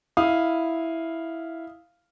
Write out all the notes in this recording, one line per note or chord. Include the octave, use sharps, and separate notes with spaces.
E4 F5 D#6